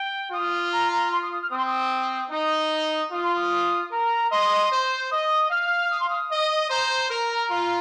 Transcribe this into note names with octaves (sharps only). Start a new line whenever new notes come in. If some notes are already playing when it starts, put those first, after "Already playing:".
Already playing: G5
F4 D#6
A#5
A#5
C6
D#6
D#6
F6
C4 D#6
C6
D#6
D#4 D#6
F4 D#6
C6
D#6
A#4 A#5
D#5 C6
C5
D#5 D#6
F5 F6
D#6
C6
D#6
D#5
C5 A#5
A#4 A#5
F4